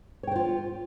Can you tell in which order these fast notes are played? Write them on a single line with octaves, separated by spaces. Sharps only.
C#5 G5 C5 F4